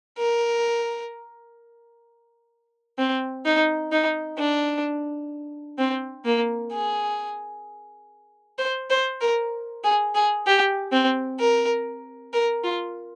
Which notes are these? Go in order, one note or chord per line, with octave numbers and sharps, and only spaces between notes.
A#4
C4
D#4
D#4
D4
C4
A#3
G#4
C5
C5
A#4
G#4
G#4
G4
C4
A#4
A#4
F4